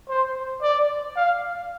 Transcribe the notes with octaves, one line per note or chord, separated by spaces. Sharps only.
C5
D5
F5